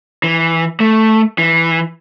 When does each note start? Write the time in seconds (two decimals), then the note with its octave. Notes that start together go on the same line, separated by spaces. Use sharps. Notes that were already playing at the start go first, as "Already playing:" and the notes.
0.23 E3
0.80 A3
1.38 E3